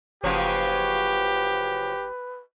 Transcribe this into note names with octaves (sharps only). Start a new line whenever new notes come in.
F#1 C#3 F3 F#3 G4 B4